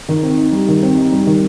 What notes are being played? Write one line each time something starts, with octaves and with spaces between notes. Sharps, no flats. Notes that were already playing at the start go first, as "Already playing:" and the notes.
D#3
C4
D#4
G3
D#3
C4
D#4
G3
D#3